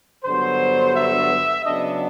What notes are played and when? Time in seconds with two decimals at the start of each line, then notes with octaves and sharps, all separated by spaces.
0.25 G2 D3 F#3 B3 C5
0.95 E5
1.65 C#3 F#3 B3 D4 D#5